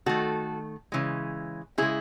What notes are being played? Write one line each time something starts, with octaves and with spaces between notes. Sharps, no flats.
D#3 A3 F#4 A4
C#3 E3 G#3
C#3 G#3 E4 G#4